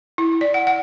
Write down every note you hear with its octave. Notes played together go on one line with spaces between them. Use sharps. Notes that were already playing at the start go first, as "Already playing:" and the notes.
E4
D5
F#5
F#5